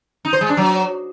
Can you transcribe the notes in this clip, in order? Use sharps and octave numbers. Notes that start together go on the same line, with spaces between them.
D#4
C5
G#3
D4
F#3